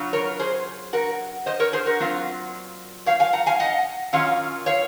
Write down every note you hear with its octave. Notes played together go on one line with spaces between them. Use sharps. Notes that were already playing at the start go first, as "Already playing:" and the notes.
Already playing: C#3 F#3 C#4 F4
A#4 C#5
G#4 C5
F#4 A#4
C5 D#5
A#4 C#5
G#4 C5
F#4 A#4
A#2 F#3 C4 F4
C#5 F5
F5 G#5
F#5 A#5
F5 G#5
D#5 F#5
F#2 D#3 F#3 C#4 F4 C#5 F5
C#5 F5